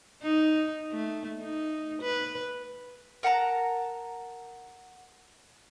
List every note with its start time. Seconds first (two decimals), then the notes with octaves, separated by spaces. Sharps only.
0.22 D#4
0.91 A3
1.40 D#4
2.02 B4
3.23 A#4 F#5 A5 A#5